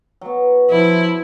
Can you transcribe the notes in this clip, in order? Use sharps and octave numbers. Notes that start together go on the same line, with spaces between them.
F#3 B3
F3 E4